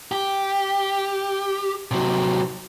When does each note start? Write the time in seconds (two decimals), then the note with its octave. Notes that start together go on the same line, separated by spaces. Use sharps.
0.12 G4
1.91 C3 F#3